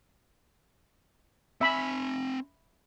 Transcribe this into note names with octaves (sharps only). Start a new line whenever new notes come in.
C4 E5 G#5 B5